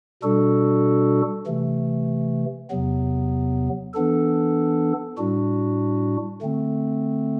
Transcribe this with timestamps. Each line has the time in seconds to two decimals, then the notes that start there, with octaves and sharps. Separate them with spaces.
0.23 B2 G3 D4 F#4 A4
1.47 C3 E3 A3
2.70 E2 C3 F#3 B3
3.94 E3 B3 D4 A4
5.18 A2 G3 D4 F#4
6.42 D3 A3 C4